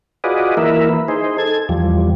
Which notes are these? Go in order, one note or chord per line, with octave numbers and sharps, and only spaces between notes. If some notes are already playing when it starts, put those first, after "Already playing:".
F4 F#4 G#4 B4 D5 D#5
E3 A#3 E4 A#4 B4 E5
D#4 G#4 C5
A4 G#6
E2 F3 G3